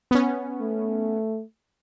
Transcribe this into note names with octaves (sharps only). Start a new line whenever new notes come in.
B3 C#4
A3